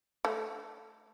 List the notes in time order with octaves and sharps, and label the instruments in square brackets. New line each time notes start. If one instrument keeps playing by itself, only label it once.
[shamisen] A3